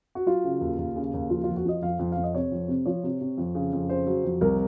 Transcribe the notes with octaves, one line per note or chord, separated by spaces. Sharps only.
F#4
F#3 F4
C#3
D#2
D#2
C#3
D#2
F3 F4
F4
F2
F#4
F3 D#5
F2 F5
F2
F2 F5
D#5
C3 C#5
F2
C3
F3 C#5
C3
C3
F2
C#3
F2
C#3 C5
F#3
F2
C2 A#4